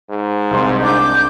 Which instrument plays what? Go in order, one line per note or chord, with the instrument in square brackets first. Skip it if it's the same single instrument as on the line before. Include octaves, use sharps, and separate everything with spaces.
[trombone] G#2
[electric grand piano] C2 [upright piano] C4 C6
[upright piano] D4 [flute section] D6 G6